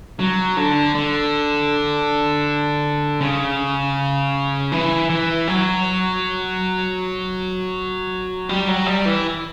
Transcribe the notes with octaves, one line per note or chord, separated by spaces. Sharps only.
F#3
D3
D3
C#3
E3
E3
F#3
G3
F#3
G3
E3